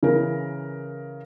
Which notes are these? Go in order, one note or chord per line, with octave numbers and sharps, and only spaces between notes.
C#3 E3 A#4